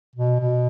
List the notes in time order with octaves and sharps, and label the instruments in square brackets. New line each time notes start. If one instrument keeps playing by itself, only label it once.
[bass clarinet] B2
B2